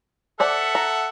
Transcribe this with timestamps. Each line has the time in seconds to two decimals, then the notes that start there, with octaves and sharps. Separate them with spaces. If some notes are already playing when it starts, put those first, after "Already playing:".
0.40 A4 C5 D5 E5 F#5 A5
0.75 A#5